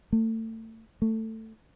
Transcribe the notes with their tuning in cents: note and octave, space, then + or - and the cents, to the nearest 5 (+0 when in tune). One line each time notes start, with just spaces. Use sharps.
A3 +30
A3 +15